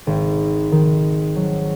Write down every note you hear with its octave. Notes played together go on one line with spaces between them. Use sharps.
G#1
D#3
F#3